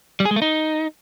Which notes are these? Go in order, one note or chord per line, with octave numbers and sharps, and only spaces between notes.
G3
G#4
G#3
A3
D#4